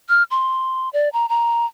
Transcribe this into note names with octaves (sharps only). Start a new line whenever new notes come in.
F6
C6
D5
A#5
A#5